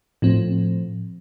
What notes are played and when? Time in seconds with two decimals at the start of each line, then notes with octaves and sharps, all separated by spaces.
0.22 A2 F3 C4